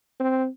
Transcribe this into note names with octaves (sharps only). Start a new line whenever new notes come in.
C4